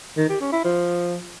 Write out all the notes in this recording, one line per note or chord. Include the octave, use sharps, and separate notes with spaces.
D#3
G4
C#4
E4
F3